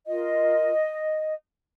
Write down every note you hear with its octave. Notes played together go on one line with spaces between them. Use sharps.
F4 A#4 D#5